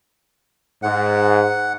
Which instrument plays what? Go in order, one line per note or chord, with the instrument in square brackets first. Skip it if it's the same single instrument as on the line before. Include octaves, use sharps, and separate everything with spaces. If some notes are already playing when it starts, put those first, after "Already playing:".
[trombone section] G#2 [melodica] F#5